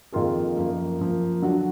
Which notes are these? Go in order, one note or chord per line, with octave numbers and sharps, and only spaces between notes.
F2 D#3 A#3 F4 G#4
F#2 F3 A#3
F#2 F3 A#3
D3 F#3 D4 F#4